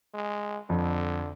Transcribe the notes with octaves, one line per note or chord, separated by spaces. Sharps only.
G#3
F2 D3